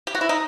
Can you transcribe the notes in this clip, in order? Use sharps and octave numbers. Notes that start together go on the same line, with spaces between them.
G4
F#4
E4
D#4